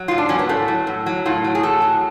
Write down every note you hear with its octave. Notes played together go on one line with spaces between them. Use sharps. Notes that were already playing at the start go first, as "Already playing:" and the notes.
Already playing: F#3
G#2 F4
D4
F#3 C#4
B3
A2 A3
F#3
A2
F#3
A2 F4
F#3
G#4
A2 A4
F#3